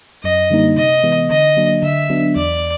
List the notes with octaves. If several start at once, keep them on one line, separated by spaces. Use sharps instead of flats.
F#2 D#5
D3 G3 A#3 D#4
C3 D#5
E3 G#3 B3
D3 D#5
F#3 A#3 D4
D3 E5
F#3 B3 D4
E2 D5